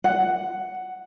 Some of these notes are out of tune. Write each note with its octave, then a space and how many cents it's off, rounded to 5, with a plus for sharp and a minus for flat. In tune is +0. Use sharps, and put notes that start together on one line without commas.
F#5 +5